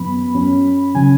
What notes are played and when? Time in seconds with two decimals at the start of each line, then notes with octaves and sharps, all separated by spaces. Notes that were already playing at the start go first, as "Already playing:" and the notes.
Already playing: F#2 F#3 B3 B5
0.34 F#2 F#3 C#4
0.95 C#3 F#3 C#4 G#5